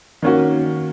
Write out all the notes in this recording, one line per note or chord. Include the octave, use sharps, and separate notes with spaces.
D#3 A#3 C#4 F#4